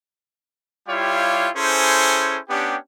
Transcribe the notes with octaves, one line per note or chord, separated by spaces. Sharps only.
G3 E4 F4 G4 C#5 F5
C#4 E4 G#4 A4 C5
B3 C#4 D4 G4